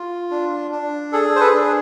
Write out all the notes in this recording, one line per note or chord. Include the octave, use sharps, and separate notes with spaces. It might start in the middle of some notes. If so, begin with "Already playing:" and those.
Already playing: F4
D4
D4
G#4 A4
C5
A4 B4
D4